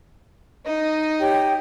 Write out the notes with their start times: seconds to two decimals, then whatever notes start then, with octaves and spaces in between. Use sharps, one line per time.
0.66 D#4 D#5
1.19 G4 C#5 G5